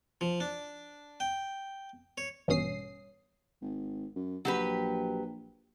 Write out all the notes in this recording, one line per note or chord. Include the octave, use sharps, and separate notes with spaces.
F3
D4
G5
C#5
A1 G2 B2 C#4 D#6 C7
G#1
F#2
A#1 F#3 G4 B4